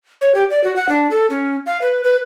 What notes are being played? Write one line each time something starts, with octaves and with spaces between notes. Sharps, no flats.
C#5
G4
D5
F#4
F#5
D4
A4
C#4
F5
B4
B4